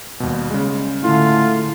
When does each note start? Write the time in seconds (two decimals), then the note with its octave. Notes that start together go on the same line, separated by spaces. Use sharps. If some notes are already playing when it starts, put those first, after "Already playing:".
0.20 D#2 B2 G3
0.50 C#3 G#3
1.04 A2 D3 F4